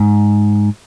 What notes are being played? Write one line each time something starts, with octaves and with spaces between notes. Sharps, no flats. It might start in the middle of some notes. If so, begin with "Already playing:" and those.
Already playing: G#2